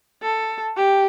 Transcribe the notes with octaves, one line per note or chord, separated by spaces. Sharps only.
A4
G4